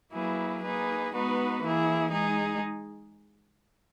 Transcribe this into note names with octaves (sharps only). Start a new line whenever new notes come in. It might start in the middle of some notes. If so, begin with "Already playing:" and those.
F#3 A#3 E4 G#4 B4
A#3 D#4 G#4 B4
G#3 B3 D#4 F#4 B4
E3 A#3 E4 G#4
G#3 D#4 G#4